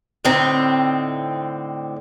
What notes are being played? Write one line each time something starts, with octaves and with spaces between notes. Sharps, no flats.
A2 D3 C4 D#4